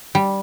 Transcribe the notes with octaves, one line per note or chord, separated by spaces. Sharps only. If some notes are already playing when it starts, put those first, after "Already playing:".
G3